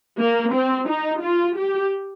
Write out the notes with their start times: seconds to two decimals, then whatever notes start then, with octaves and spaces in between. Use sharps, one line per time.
0.18 A#3
0.53 C4
0.88 D#4
1.21 F4
1.57 G4